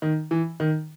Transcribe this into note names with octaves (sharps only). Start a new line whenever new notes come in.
D#3
E3
D#3